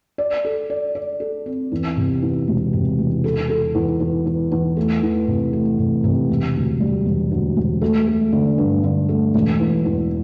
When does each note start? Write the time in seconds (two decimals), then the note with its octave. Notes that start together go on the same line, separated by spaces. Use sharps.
0.18 D5
0.45 A4
0.70 D5
0.95 D5
1.20 A4
1.46 C4
1.72 E2
1.97 C3
2.22 E2
2.47 E1
2.73 C3
2.99 E1
3.24 A4
3.49 A4
3.75 E2
4.00 E2
4.26 E2
4.52 E2
4.77 A3
5.02 E3
5.27 C3
5.53 A3
5.79 C3
6.04 C3
6.29 E1
6.54 D2
6.80 G3
7.06 E1
7.31 D2
7.56 E1
7.82 A3
8.07 A3
8.33 D3
8.58 G2
8.84 D3
9.09 A3
9.34 E1
9.60 E2
9.85 E2